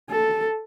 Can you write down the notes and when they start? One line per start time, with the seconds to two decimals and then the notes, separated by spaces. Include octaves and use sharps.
0.10 A4